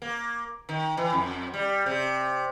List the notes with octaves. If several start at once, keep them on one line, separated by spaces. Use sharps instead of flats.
A#3
D#3
E3
F2
G3
C3